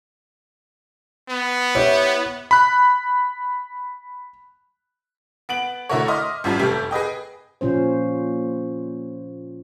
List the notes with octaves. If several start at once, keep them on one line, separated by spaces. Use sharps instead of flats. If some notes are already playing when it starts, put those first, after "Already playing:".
B3
E4 G4 C#5
B5 F#6
B3 D7 F#7
D3 A3 E4 F#4 A#4 C#5
D#5 E5 C6 D6 D#6 F6
G#1 F#2 G3 F4 A5
F1 A3 G4 E5
G#4 B4 D#5 G5
A#2 F3 C#4 C5